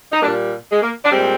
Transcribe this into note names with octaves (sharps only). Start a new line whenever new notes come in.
D#4
A#2 G3 A#3 D4
G#3
A#3
D4
A#2 G3 G#3 C4